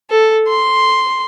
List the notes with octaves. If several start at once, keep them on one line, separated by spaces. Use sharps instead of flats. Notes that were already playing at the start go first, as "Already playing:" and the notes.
A4
C6